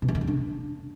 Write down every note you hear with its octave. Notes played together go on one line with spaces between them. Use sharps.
B2
E3
D3
F3
D4